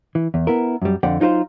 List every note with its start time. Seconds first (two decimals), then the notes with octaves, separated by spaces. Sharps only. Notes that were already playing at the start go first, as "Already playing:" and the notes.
0.15 E3
0.34 E2
0.47 B3 E4 A#4
0.82 F#2 G3
1.03 F2 D3 D5 F#5 G5
1.20 F#3 D#4 F4 A#4 C5